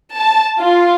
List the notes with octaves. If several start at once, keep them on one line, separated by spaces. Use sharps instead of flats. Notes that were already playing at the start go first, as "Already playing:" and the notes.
A5
F4